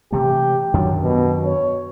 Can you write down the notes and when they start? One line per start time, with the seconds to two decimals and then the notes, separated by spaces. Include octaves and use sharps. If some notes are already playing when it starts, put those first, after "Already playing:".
0.12 C3 E3 A3 G4
0.74 F#2 D#3 F#3 D4
1.03 B2
1.44 C#5